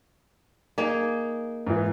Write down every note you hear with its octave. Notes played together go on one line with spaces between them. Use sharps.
A#3 D#4 G#4
G#2 E3